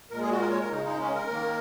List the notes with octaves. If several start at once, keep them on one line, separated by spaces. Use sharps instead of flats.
A#2 G#3 A#4
G#4
F#4
A#4
C#5
A#4
C#3 G#3 D#4
D#4
C#4
A#4
D#3 A#3